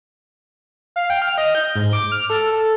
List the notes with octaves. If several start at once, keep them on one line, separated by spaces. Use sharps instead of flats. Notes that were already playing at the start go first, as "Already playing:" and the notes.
F5
G5
F6
D#5
G6
G#2
D6
F6
A4
A4